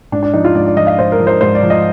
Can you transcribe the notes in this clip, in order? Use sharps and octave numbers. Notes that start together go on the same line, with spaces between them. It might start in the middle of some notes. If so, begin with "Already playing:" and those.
G#2 D4
D4
F3 D#4
F4
G#2 D5
D5
F3 D#5
F5
G#2 C5
A#4
F3
C5
G#2 C5
D5
F3
D#5